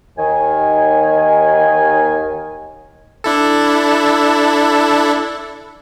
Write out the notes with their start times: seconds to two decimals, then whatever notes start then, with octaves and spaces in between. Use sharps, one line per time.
0.17 D#2 D#3 G#5
3.24 D4 E4 A4